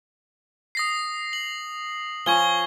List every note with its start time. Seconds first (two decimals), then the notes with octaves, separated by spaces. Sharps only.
0.75 D#6 A#6 C7
1.33 F#7
2.26 F3 C#4 C#6 G#6 G7